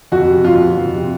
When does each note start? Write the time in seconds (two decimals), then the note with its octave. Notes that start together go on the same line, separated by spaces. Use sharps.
0.12 F2 F#4
0.29 C3
0.44 F2 F4
0.61 C3
0.78 F2
0.94 C3